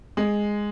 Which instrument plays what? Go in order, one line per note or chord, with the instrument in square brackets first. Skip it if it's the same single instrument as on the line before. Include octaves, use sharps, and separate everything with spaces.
[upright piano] G#3